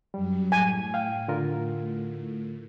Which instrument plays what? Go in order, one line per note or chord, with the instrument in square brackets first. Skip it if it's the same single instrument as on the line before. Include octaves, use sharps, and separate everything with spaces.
[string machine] F#2 F#3 [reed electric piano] G3
[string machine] A2 [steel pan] G#5
[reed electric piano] F5 G5
D3 F4 A#4